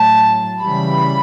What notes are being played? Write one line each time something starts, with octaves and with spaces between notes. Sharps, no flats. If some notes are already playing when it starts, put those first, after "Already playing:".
Already playing: A2 F#3 A5
C#3 E3 G3 B5